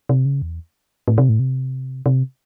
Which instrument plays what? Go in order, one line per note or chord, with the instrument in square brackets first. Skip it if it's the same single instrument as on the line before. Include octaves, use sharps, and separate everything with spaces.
[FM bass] C3
C#3
E2
A2
C3
A2
C3
C3